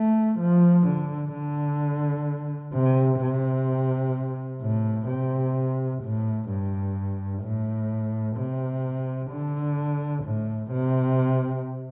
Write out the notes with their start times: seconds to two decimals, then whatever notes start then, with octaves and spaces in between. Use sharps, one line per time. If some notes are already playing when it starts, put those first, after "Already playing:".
Already playing: A3
0.39 F3
0.87 D3
1.33 D3
2.73 C3
3.21 C3
4.61 A2
5.08 C3
6.03 A2
6.49 G2
7.43 A2
8.37 C3
9.30 D3
10.24 A2
10.71 C3